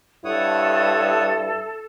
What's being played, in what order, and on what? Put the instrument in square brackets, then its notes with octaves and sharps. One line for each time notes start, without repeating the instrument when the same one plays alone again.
[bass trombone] G2 [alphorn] E4 [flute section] A4 [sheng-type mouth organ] C#5 F#5 D#6